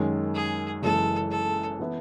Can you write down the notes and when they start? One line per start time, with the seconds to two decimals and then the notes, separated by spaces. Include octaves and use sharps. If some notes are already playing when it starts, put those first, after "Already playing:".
Already playing: F#2 D#3 G#3 C#4
0.34 G#4
0.82 F#1 F#2 E3 G#3 A4
1.31 A4
1.80 E3 B3 E4